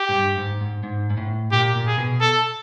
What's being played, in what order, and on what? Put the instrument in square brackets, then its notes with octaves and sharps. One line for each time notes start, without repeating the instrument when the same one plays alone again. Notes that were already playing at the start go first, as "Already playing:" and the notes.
Already playing: [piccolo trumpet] G4
[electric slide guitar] G#2
G2
G#2
G#2
G#2
G#2
A2
[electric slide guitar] A#2 [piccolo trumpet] G4
[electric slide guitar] A#2
[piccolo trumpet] G#4
[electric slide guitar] B2
[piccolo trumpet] A4